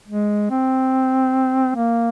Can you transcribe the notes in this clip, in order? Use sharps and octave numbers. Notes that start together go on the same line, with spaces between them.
G#3
C4
A#3